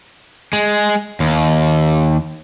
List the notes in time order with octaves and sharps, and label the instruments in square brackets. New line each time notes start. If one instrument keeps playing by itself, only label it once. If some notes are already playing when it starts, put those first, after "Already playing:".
[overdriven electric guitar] G#3
D#2